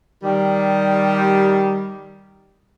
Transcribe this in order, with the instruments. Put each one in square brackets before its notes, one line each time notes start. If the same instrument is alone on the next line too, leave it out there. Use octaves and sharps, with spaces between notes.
[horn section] D#3 G3